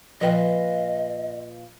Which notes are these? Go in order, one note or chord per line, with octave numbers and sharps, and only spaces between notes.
A#2 F3 B4 D#5 F5 G5